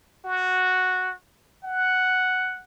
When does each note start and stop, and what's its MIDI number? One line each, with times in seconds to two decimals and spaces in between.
0.25 1.14 66
1.63 2.63 78